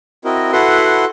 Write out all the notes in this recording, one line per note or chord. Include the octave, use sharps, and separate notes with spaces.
C4 E4 F#4 A#4 D#5
E4 F#4 A4 B4 F#5 C6